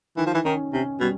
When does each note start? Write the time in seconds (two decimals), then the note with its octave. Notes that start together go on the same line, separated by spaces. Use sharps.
0.17 D#3 E3
0.26 F3
0.34 E3
0.45 D#3 C#4
0.73 C3 C#4
1.00 B2 G3